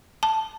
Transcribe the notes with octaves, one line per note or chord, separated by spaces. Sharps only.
A5